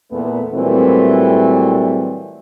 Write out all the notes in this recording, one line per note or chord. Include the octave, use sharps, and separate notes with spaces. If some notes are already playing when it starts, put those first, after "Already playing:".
E2 A#2 A3 B3
A#2 E3 F#3 G3 A3 C4